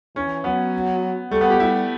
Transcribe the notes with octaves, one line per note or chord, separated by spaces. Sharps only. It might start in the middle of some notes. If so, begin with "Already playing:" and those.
E3 C#4
F#3 B3
G3 A3
B3
G4
G3 E4